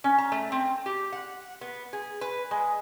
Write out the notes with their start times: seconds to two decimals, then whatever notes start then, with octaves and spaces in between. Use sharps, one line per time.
0.04 C#4
0.18 A#5
0.32 A3
0.52 C4
0.86 G4
1.12 F#5
1.61 B3
1.93 G#4
2.21 B4
2.51 G#3